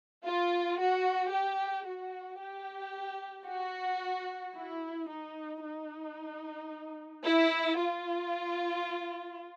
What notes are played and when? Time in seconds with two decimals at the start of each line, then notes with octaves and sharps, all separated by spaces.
0.25 F4
0.78 F#4
1.32 G4
1.86 F#4
2.40 G4
3.47 F#4
4.55 E4
5.10 D#4
5.63 D#4
7.24 E4
7.79 F4